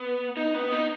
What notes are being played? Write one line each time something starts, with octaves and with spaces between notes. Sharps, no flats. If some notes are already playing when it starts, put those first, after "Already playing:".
Already playing: B3
D#4
B3
D#4